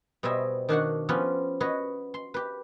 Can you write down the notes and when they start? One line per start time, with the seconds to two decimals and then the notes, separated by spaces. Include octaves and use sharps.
0.23 B2 G3 C5 D#5 E5 G#5
0.69 D#3 D4 F#4 F#5
1.09 F3 B3 C#4 F4 G4 B4
1.61 F#4 B4 C#5 D#5
2.14 C6
2.34 G4 B4